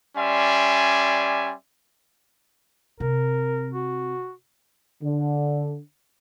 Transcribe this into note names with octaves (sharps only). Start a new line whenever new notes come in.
G3 C#4 D5 E5 G#5 C6
C3 A#4
F#4
D3